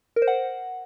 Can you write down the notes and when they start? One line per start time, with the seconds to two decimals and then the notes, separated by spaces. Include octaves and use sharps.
0.16 A#4
0.22 C5
0.28 F#5